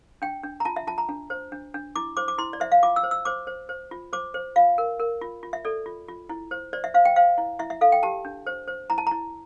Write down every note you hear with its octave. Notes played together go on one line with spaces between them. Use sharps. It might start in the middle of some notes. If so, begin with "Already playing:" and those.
D4 G5
D4
A#5
F4 A5
E5
F4 A5
A#5
D4
C5
D4
D4
E4 D6
C5 D6
D6
E4 C6
D5
C5 E5
F5
F4 D6
E6
C5
E6
C5 D6
C5
C5
F4
C5 D6
C5
F4 F5
A#4
A#4
F4
F4
E5
A4 D5
F4
F4
E4
C5
C5 D5
E5
C5 F5
G5
C5 F5
E4
E4 E5
E5
A4 F5
G5
G4 A5
D4
C5
C5
E4 A#5
A5
E4 A#5